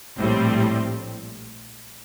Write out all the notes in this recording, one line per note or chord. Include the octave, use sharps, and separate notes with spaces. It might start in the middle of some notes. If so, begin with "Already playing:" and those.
A#1 A2 G3 C4